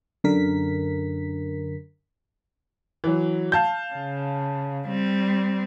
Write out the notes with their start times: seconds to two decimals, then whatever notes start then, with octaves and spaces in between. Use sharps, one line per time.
0.24 F#2 D3 A#4 B6
3.04 E3 F#3
3.52 F5 A5 G6
3.94 C#3
4.88 G3 C4